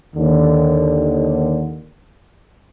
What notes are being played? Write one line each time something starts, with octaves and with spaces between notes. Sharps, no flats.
D#2 D3